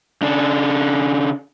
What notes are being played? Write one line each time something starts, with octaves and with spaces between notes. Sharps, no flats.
C#3 D4